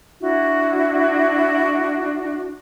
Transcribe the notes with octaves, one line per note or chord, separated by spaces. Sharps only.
D4 E4 F#4